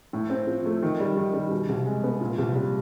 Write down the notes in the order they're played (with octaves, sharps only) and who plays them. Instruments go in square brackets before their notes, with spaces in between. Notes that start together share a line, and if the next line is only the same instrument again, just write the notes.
[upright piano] A2
C4
F3
A3
D#3
G3
D#3
G3
B2
C2
G#3
B3
A#2
C2
G3